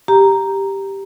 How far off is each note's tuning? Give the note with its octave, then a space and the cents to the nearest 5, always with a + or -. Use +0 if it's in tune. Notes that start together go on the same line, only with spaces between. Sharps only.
G4 +0 A#5 +0